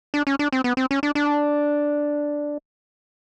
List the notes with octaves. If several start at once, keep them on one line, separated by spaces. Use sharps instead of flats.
D4
C#4
D4
C4
B3
C4
C#4
D4
D4